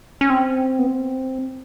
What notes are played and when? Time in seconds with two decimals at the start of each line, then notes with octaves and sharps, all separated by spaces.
0.21 C#4
0.30 C4
0.79 B3
0.87 C4